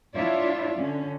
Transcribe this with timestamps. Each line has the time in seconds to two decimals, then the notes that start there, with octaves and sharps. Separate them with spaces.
0.15 D4 E4 F4 C#5 D5 E5
0.76 D3 C#4